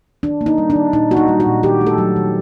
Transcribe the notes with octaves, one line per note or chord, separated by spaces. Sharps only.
D#3 D4
A#3
D#4
G3
D4
D#3
A#2 D#4
A#3 F#4
D#4
G3
F#4
A#2
D#3 G4
A3
A4
F#3
D#3